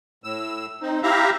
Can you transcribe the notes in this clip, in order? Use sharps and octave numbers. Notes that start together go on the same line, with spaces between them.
A2 E6
C4 D#4
E4 G4 E5 F5 A#5